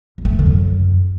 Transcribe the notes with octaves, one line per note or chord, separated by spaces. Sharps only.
E2
A3
C#3
D3
F#2